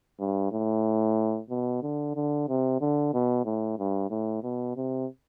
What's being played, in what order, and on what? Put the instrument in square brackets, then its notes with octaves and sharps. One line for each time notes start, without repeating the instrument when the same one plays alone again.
[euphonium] G2
A2
B2
D3
D3
C3
D3
B2
A2
G2
A2
B2
C3